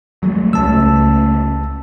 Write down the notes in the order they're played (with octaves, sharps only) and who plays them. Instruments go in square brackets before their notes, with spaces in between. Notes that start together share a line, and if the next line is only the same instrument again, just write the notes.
[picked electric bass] F#3 G#3 A3
[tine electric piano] C#2 A5 E6 [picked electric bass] C#3 A3 C#4